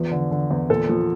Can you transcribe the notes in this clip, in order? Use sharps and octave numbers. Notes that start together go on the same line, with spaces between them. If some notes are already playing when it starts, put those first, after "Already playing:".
Already playing: E2 F3
D3
D3
E2
A#2 A4
F3